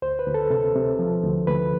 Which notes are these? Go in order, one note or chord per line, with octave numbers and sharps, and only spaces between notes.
D2 C5
B4
D2
A4
C3 A4
C3
F3
D2
D2 B4